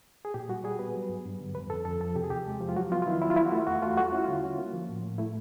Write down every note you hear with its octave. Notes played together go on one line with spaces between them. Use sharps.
G#4
A#2 G4
G3 F#4
G3 G#4
B3 B4
F#3
G2
G2
D3
F2 B4
F2 A4
F2 A4
F3 A4
C3 G4
G#4
E2 G4
G#3
F3
F4
F#3 F#4
B3 F4
F4
D#3 E4
F#3 E4
F4
E3 E4
F#4
A3 F4
E2 F#4
A3 F4
G3 F#4
F4
C#4 E4
D3 F4
C#4
A#3
F3
A2
A2
A3 E4